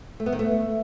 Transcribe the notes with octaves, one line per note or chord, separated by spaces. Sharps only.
A3
B3
D#3
A3